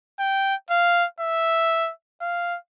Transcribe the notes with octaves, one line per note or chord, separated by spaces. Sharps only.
G5
F5
E5
F5